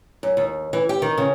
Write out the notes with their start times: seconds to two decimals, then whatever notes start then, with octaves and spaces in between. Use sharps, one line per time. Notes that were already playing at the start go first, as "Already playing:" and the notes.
0.23 F#2
0.37 D#2
0.73 E3
0.89 G4
1.02 D#3
1.18 C#3